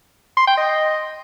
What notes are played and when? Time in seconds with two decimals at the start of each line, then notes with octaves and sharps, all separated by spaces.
0.37 C6
0.47 G5
0.57 D#5